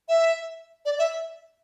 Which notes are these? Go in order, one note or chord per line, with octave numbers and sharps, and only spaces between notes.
E5
D5
E5